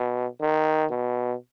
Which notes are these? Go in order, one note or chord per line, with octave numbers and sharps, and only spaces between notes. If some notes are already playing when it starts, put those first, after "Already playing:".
Already playing: B2
D#3
B2